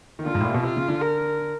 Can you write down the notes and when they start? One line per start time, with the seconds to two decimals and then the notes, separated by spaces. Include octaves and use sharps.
0.19 D#3
0.26 D3 F4
0.35 G#2
0.41 A2
0.45 A#2
0.50 C3
0.54 B2
0.63 C3 F4
0.77 C#3
0.88 D3
1.01 A#4